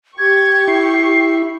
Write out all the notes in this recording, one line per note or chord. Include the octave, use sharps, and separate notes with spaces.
G4 C#6 G#6
E4 C7